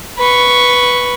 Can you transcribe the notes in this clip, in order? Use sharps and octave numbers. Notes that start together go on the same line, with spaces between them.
B4 C#6